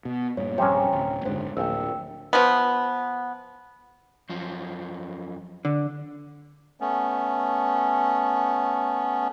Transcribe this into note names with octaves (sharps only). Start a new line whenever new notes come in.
B2
G2 A#2 C#5
A#1 G2 C3 C#4 G5 A#5
D1
F#1 G#2 D3 C5
D1 A#1 G5 E6
F3 B3
F#2 F3
D3
A3 B3 C#4